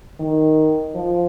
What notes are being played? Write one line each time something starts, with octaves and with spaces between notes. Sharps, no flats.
D#3
F3